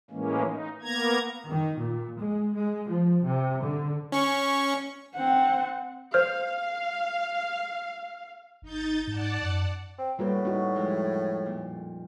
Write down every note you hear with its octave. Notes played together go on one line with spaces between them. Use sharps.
A2 E3 G#3 A#3 C#4
D#4
A#3 B3 A#5 G#6
D#3
A#2
G#3
G#3
F3
C3
D3
C#4 C#6
C4 F#5
C5 F5 F6
G#1 D#4 G6 A6
G#2 D5 F#5 A5
F#2
C4
A2 G3 A#3 C4 F#4 B4
D#4 F#4
F2 G#3 E4
A#2